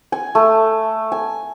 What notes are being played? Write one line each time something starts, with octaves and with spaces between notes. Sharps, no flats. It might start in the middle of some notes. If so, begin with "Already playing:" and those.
G#5
A3
G#5